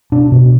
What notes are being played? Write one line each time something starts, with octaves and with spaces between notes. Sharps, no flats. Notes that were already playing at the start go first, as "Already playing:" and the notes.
B2 D4
B2